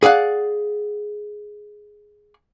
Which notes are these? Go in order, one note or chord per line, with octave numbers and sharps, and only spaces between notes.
G#4 D5 F5 F#5